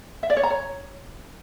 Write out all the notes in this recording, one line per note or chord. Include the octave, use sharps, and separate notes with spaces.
E5
D5
C#5
A#5
C#5